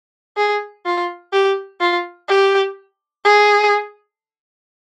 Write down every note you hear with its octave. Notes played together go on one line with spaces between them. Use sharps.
G#4
F4
G4
F4
G4
G#4